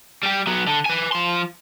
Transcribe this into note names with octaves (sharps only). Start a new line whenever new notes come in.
G3 G4
F#3 B3
D3
B4 G#5
F3 C6